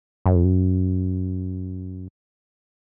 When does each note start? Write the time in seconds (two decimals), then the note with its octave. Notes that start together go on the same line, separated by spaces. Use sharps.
0.26 F#2
0.35 F2
0.44 F#2